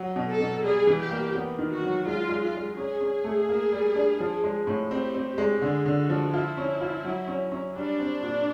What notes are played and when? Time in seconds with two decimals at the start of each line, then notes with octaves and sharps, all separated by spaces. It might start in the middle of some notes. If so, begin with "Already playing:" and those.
Already playing: F#3
0.16 B2
0.28 A4
0.40 B2
0.64 G3 G#4
0.87 E3
1.00 G4
1.11 A#3
1.35 B3
1.59 D#3
1.70 F#4
1.83 F#3
2.06 G#3 F4
2.29 G#3
2.42 F4
2.54 G#3
2.77 C#4 G#4
3.01 C#4
3.24 A3
3.49 A#3
3.72 G3
3.96 D4
4.20 F3
4.44 G#3
4.67 A2
4.91 C4 G4
5.14 C4
5.27 G4
5.38 G#3
5.62 D3 G#4
5.86 D3
5.97 F#4
6.09 F3
6.33 E4 F4
6.57 C#4
6.81 F4
7.04 F#3
7.28 C#4
7.52 C#4
7.76 G3 D4
8.00 C4
8.23 A#2